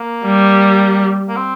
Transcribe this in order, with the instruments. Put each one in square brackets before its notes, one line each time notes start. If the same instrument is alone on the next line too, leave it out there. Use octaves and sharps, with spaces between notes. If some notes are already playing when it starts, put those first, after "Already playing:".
Already playing: [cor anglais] A#3
[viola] G3
[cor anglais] A#3
C4